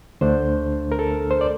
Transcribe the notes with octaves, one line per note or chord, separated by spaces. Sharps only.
D2 D3 A3 D4 C5
A#4
A4
C5
D5